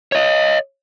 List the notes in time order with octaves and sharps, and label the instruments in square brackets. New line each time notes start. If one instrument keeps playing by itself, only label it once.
[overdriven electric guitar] C#5 D#5